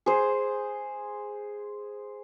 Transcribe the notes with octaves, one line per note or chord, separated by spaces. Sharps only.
G#4 C5